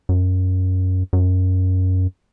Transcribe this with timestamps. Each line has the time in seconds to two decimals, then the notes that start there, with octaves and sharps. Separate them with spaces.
0.09 F#2
1.13 F#2